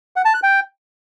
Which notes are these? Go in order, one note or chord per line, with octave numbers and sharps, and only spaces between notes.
F#5
A5
F#6
G5